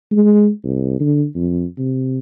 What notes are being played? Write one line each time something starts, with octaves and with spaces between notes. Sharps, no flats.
G#3
C2
D3
F2
C3